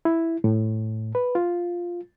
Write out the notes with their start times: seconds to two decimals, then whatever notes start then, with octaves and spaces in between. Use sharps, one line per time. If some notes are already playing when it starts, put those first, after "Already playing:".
0.05 E4
0.44 A2
1.15 B4
1.35 F4